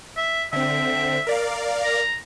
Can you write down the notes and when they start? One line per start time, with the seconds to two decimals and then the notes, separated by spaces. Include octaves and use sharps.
0.17 E5
0.53 D3 C4 E5
1.27 A#4 D5 F5
1.84 A#5